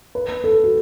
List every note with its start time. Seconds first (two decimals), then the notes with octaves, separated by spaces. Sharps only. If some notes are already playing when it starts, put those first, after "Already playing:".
0.15 B4
0.44 A4
0.64 F#4